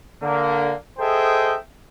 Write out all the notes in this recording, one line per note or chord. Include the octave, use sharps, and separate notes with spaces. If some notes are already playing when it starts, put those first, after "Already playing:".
D3 A#3
G#4 A4 C5 D#5 E5 G5